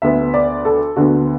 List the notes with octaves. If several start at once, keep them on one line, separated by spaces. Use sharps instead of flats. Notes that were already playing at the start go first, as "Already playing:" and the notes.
D2 D3 B3 E5
D5
A4
D2 D3 B3 F#4